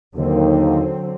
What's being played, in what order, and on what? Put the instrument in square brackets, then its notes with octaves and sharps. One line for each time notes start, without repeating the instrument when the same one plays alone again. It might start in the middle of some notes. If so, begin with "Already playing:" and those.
[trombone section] D#2 [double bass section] D3 F#3 C4